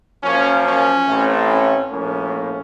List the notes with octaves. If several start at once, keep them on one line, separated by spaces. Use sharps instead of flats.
F#2 F3 A#3 C#4
C#4
A1 A2 A3 C4
C#4
A#1 A2 F3 A#3 C#4